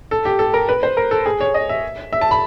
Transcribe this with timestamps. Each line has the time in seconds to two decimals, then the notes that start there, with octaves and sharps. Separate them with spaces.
0.11 A4
0.25 G4
0.39 A4
0.54 A#4
0.69 B4
0.83 C5
0.97 A#4
1.11 A4
1.26 G#4
1.41 C#5
1.54 D#5
1.69 E5
2.13 E5
2.21 A5
2.31 B5